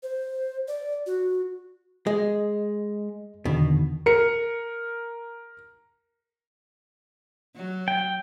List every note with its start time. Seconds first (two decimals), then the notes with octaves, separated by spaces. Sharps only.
0.03 C5
0.68 D5
1.06 F#4
2.07 G#3 D#5
3.45 E2 B2 D3 D#3
4.06 A#4 C#7
7.56 F#3
7.88 G5